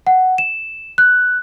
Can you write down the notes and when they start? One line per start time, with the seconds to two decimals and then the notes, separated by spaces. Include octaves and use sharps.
0.07 F#5
0.38 E7
0.98 F#6